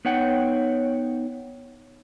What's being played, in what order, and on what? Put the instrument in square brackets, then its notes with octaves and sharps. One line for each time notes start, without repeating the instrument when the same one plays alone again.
[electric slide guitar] B3 D#4 C#5 F#5 G5